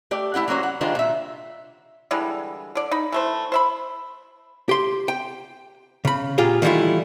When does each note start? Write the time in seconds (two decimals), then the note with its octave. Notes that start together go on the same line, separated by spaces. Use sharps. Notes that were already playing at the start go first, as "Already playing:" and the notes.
0.11 A3 G4 D5
0.34 A3 E4 G4 F#5
0.48 F#3 A#3 C#4 F#4 C5
0.63 F#5
0.81 D#3 G3 G#3 D4 F4 C5
0.95 A#2 E5
2.11 D3 E3 G3 G#3
2.75 D3 D5
2.91 D#4 B5
3.12 E3 A3 C5
3.52 C5 E5 B5
4.69 G4 C6
5.08 G5
6.05 C#3 B5
6.38 A#2 F4 G4 G#4
6.62 D#3 E3 G3 A3 E4 F4